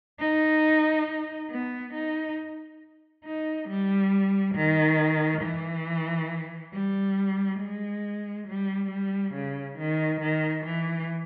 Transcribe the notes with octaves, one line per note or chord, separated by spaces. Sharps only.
D#4
B3
D#4
D#4
G3
D#3
E3
G3
G#3
G3
G3
C#3
D#3
D#3
E3